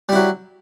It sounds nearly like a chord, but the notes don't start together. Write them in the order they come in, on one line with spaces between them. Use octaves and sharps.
G3 E4 F#3